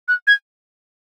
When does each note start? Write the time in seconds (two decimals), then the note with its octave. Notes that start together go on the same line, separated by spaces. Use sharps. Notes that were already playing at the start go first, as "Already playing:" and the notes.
0.08 F#6
0.27 G#6